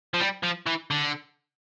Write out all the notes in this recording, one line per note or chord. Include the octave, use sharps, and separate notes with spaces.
F3
G3
F3
E3
D3